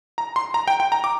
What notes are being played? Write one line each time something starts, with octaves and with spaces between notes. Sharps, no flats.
A#5
C6
A#5
G5
G5
A#5
D6